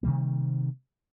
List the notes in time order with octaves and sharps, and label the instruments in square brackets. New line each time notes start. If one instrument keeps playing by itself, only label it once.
[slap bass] C3 D#3 G3 A#3